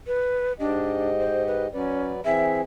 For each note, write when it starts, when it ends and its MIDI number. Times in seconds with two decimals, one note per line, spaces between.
0.07 0.53 71
0.60 1.67 44
0.60 1.11 62
0.60 1.67 67
0.60 1.67 75
1.19 1.44 72
1.47 1.63 71
1.74 2.21 54
1.74 2.12 61
1.74 2.21 71
1.74 2.21 74
2.25 2.61 52
2.25 2.61 60
2.25 2.61 68
2.25 2.59 76